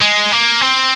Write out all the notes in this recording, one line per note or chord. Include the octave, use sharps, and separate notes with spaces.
G#3
A#3
C4